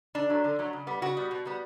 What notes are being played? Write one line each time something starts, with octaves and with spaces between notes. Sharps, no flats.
D3 D4
F#3 A3
D3
F#3 A3
C#3
G3 B3
C#3 F#4
G3 B3
B2
G3 B3